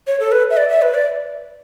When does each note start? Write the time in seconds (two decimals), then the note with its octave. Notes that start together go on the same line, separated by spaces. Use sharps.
0.07 C#5
0.20 A4
0.32 B4
0.50 E5
0.57 D5
0.69 E5
0.82 B4
0.94 D5